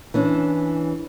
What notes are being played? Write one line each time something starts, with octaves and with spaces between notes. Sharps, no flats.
E3 C#4 D4